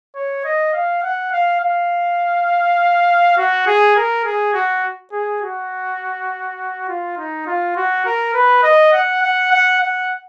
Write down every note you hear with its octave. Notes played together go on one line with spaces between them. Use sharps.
C#5
D#5
F5
F#5
F5
F5
F#4
G#4
A#4
G#4
F#4
G#4
F#4
F4
D#4
F4
F#4
A#4
B4
D#5
F#5
F#5
F#5
F#5